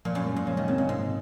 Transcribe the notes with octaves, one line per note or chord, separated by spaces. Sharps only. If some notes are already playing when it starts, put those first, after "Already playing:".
A#2 F3
F#2
G#3 C#4
A#2
C#3 F3
D#3
C#3 G#3 C4
A#2
G#2 C3